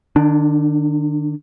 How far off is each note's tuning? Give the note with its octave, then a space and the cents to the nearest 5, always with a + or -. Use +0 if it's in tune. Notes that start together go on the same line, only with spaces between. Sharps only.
D#3 -45 D4 +0